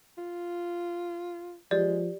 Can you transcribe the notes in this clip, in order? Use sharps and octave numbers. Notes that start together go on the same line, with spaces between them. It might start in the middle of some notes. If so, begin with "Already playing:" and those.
F4
F3 G#3 G4 D5